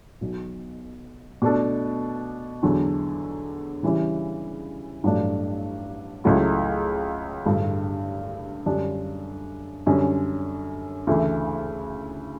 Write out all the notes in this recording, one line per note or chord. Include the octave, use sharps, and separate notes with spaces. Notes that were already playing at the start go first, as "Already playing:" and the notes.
B1 B2 F#3
B2 A3 D4 A4
E2 D3 F#3
C#3 E3 G3 C#4 E4
A1 G2 F#3 A3 D4
C#2 C#3 F#3 A3 E4
A1 G2 D3 A3
F#2 D3 G3 D4 G4
F#2 D3 G3 C#4
D2 C#3 E3 A3 E4